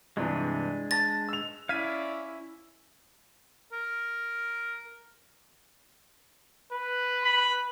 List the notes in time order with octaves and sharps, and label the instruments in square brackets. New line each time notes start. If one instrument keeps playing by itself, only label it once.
[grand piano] G2 C3 E3 [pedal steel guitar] G#3 D4 G#4
[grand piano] A5 A#6 [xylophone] A6
[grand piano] E6 F7
[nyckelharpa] C#4 E4 [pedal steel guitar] D5 F5 [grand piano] G#6 B6 D#7
[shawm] A#4
[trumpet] B4
[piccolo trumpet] B5